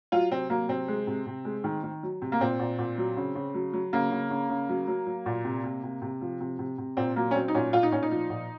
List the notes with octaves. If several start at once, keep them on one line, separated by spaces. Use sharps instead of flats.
F#3 F4
C3 C4
F#3 A#3
C3 C4
G#3
C3
C3
G#3
D#3
D#3
F#3
C3
A#3
A#2 C4
A#2
A#2
F#3
C#3
C#3
F#3
F#3
C#3 A#3
C#3
C#3
C#3
F#3
F#3
F#3
A#2
C3
C3
C3
C3
F3
C3
C3
C3
A#2 C4
F#3 A#3
C#4
F#3 C4
D#4
A#2 C#4
A#2 F4
D#4
A#2 C#4
D#4
F3
A#2